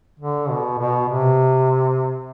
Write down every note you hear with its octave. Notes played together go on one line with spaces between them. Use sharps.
D3
B2
B2
C3